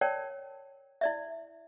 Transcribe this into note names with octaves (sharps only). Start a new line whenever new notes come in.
A#4 C#5 D5 G5 A5
E4 D5 E5